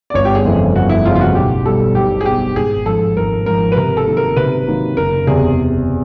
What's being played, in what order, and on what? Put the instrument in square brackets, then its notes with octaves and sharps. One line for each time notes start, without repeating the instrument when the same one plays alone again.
[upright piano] D5
[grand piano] G1 [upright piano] C#5
[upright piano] G4
G#4
[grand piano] F2 C#3 E3 A3
[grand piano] G1 [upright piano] F#4
[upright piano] E4
[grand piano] F2 C#3 E3 A3 [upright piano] F4
[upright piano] F4
F#4
[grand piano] B1 [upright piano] G4
[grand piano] B2 G3 [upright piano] A4
[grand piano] B1 [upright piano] G4
[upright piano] G#4
[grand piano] B2 G3 [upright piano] G4
[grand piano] G#1 [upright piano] G#4
[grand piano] G#2 F3 [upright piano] A4
[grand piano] G#1 [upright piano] A#4
[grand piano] G#2 F3 [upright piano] A#4
[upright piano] B4
[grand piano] C3 [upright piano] A#4
[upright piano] A4
[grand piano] D#3 F#3 A#3
[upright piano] A#4
[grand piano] C3 [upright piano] B4
[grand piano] D#3 F#3 A#3
[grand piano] F#1 [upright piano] A#4
[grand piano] E2 C3 [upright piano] G#4